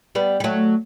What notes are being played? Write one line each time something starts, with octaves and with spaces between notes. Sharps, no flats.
G3 B3
G3
F#3 A3